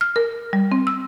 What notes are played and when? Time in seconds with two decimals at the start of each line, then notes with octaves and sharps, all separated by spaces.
0.01 F6
0.16 A#4
0.53 G3
0.72 C4
0.87 E6